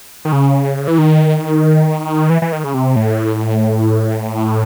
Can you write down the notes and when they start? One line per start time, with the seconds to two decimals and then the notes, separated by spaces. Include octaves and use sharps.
0.25 D#3
0.32 C#3
0.87 E3
0.98 D#3
2.30 E3
2.42 E3
2.52 D#3
2.64 C#3
2.74 C3
2.96 A2